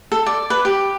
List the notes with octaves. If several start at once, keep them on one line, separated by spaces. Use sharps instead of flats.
A4
D5
B4
G4